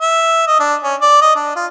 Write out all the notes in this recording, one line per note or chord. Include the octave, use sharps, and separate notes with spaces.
E5
D#5
D4
C#4
D5
D#5
D4
F4